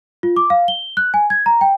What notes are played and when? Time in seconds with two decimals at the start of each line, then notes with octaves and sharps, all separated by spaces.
0.23 F4
0.36 D6
0.50 F5
0.68 G7
0.97 F#6
1.14 G#5
1.30 G#6
1.46 A#5
1.61 G5